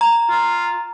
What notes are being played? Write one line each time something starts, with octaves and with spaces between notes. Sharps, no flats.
A#5
F4